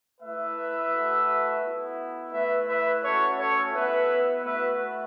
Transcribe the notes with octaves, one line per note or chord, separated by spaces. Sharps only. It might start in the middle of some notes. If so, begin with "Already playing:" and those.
A3 E4 B4 E5
A3 F#4
B3 E4
A3 E4 B4 E5
B4 E5
A3 C#4 F#4 A4 C#5
A4 C#5
B3 E4 B4 E5
A3 F#4 B4 E5